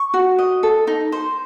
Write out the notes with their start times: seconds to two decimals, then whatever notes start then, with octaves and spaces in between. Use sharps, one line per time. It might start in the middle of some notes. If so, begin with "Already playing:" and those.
Already playing: C#6
0.14 F#4
0.39 D#5
0.63 A4
0.87 D#4
1.12 C5